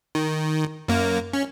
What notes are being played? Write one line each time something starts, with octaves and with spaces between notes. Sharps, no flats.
D#3
F#2 A#3
C#4